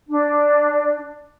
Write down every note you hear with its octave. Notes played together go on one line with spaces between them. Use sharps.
D4